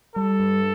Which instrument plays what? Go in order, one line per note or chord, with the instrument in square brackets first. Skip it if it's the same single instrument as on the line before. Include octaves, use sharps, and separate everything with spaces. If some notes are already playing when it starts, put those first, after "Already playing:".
[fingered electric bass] G3 [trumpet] A4
[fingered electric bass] G2